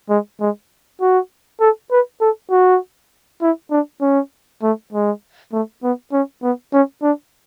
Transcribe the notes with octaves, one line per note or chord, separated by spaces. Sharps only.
G#3
G#3
F#4
A4
B4
A4
F#4
E4
D4
C#4
A3
G#3
A3
B3
C#4
B3
C#4
D4